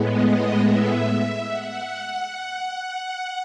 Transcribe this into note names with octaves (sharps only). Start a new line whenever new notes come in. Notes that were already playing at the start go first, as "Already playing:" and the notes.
Already playing: A2 G#3 B3
D#5
E5
F#5